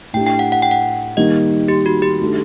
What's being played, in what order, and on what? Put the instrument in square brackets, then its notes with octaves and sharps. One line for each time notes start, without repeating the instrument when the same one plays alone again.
[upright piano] A2 A3 D4 G4 [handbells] G5
[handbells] G5
F#5
F#5
G5
F#5
[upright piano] D#3 G3 A#3 [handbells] D#5
[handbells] G4
F#4
G4
[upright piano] D#3 A3 D4 F#4 A4